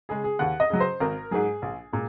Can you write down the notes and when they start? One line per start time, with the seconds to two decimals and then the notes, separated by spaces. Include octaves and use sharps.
0.09 C#3 G#3 G#4
0.24 G#4
0.39 D#2 F#5
0.60 D#5
0.70 C#3 F#3
0.80 C5
1.00 G#1 A#4
1.31 G#2 F#3 G#4
1.62 A#1
1.93 A#2 G#3